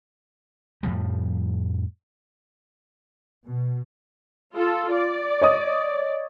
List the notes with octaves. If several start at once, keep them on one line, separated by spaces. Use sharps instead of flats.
F2 A2 F3 G3
B2
F4 A4
D5
C#5 D#5 D#6